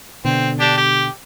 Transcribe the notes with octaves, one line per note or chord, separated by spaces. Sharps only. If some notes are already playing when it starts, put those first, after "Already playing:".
B2 D3 C4
D4 G4
G4